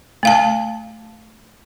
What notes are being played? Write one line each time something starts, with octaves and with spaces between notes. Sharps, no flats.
A3 F5 A5